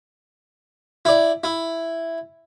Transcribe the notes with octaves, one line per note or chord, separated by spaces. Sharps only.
E4 D5
E4